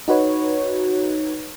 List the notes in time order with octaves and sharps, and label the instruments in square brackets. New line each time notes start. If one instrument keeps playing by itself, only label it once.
[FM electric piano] D#4 F#4 B4 C#5